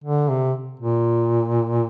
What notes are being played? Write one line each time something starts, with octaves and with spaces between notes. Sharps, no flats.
D3
C3
A#2